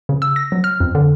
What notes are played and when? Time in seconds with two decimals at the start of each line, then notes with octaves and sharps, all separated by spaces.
0.09 C#3
0.22 E6
0.36 A#6
0.52 F#3
0.64 F6
0.80 F2
0.95 D3